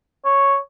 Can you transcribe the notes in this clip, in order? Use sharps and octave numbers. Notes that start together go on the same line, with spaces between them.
C#5